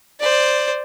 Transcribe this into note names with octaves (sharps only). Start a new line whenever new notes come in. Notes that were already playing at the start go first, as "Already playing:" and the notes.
C5 D5